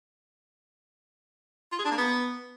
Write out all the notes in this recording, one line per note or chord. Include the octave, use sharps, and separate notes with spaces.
F4
G#4
D4
A#3
B3